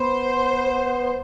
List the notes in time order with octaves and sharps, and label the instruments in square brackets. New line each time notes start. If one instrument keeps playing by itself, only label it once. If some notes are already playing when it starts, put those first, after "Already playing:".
Already playing: [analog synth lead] B3 [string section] C5